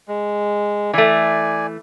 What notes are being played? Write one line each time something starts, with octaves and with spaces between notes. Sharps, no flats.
G#3
E3 A3 D5 G#5